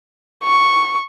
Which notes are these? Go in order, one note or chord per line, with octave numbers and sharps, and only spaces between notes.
C#6